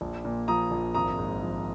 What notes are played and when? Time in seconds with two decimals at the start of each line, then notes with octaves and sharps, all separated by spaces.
0.01 A#1
0.25 A#2
0.48 F3 A#5 D#6
0.71 A#1
0.95 G#1 A#5 D#6
1.19 G#2
1.42 F3